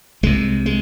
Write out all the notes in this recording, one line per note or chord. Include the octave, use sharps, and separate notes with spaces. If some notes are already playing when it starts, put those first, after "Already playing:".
C2 C3 G#3
G#3